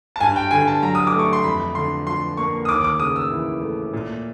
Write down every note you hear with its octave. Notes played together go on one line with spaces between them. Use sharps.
A5
G2 G#5
G5
D3 G#5
A5
F#3 A#5
D#6
D6
A3
C#6
C6
F2 B5
D3 C6
F3 C6
A#3 C#6
D#6
D#2 D6
D6
C#3 D#6
E6
E3
A3
A#2